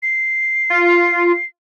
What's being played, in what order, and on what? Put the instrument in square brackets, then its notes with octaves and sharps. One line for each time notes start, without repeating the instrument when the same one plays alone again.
[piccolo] C7
[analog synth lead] F4